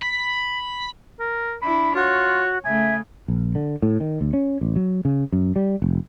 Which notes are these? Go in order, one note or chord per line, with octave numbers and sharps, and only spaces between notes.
B5 B6
A#4
D4 E4 B5
F4 F#4 C#5
C#3 A3 E5 G#5
A#1
D3
A2
D#3
D2
C#4
A1
F#3
C#3
F#2
G3
F1